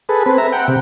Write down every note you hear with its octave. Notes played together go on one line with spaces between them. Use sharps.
G#4 A4 B4
C4 B4
E5 A#5
F#5 G5
C3